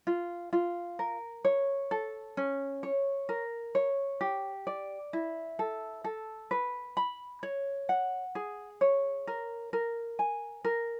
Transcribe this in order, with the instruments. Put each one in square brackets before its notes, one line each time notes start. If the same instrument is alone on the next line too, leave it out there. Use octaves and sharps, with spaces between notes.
[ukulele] F4
F4
A#4
C#5
A4
C#4
C#5
A#4
C#5
G4
D5
E4
A4
A4
B4
B5
C#5
F#5
G#4
C#5
A#4
A#4
G#5
A#4